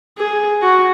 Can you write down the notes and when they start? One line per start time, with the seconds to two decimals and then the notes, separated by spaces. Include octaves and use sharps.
0.18 G#4
0.62 F#4